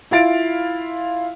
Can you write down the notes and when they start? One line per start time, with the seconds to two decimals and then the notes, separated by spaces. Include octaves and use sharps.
0.11 E4 F4 F5 A6 D7